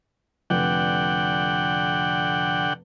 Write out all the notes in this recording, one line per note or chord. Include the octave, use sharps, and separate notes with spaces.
F1 D3 F#5 G5